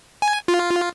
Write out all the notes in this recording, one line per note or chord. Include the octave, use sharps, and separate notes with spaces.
G#5
F4